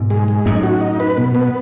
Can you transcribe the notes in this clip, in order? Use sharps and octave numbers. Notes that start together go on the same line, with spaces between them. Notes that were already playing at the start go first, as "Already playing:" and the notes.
Already playing: G#2 B2
G#3
G#3
F#2 A2 D#4
F#4
D#4
B4
B2
B3